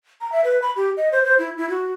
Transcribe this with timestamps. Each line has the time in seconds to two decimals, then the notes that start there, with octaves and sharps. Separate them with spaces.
0.21 A#5
0.32 E5
0.44 B4
0.62 B5
0.76 G4
0.97 D#5
1.12 C5
1.24 C5
1.39 E4
1.58 E4
1.70 F#4